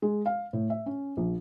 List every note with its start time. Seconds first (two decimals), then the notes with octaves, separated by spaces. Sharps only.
0.02 G#3
0.26 F5
0.53 A2
0.70 E5
0.86 C#4
1.17 A#1